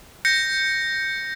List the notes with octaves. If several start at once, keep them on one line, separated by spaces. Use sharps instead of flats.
G6 A#6 C#7